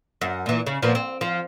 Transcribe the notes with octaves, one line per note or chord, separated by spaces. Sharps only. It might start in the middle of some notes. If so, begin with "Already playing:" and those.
F#2
A#2 E3
C#3
A#2 F3 B3
C4
F3